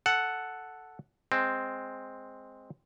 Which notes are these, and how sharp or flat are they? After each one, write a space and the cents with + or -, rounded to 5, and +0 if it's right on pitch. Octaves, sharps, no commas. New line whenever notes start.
A4 +0 F#5 +0
G#3 +0 C4 +0